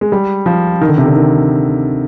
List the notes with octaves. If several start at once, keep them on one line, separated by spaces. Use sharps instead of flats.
G#3
G3
F3
D#3
D3
C3
D3
D#3